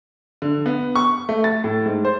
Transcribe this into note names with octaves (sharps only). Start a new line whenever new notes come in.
D3
B3
C#6
A3
A6
A2
G#2
C5